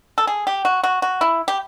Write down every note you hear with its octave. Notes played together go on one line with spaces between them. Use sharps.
A4
G#4
G4
F#4
F#4
F#4
E4
G4